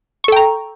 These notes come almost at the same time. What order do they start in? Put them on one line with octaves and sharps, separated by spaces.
C#6 A4 G5 A#5